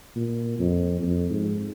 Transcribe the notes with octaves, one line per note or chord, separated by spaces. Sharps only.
A#2
F2
F2
G#2